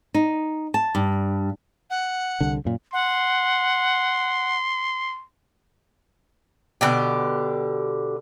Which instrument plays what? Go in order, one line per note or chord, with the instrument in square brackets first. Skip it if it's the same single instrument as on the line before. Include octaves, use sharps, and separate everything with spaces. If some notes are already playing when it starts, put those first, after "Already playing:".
[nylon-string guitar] D#4
A5
G2
[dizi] F#5
[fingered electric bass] C2 D3
F#2 A#2
[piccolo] F#5 [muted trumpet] C6
[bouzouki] B2 D3 G4